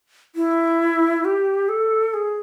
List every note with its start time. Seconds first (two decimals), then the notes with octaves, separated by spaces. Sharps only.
0.35 E4
1.25 G4
1.69 A4
2.14 G#4